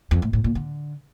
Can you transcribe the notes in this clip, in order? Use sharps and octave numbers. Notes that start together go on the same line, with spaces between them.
F2
A2
A2
A#2
D3